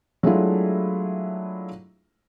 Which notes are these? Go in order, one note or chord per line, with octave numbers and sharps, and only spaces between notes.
F#3 G#3 A3 D4 E4 F4